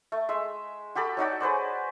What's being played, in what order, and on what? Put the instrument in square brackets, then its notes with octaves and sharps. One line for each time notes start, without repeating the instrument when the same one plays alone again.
[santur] A3
G#3 E5
F#4 G4 A4 B5
F#3 D#4 F#4 D5
G#4 B4 C5 D5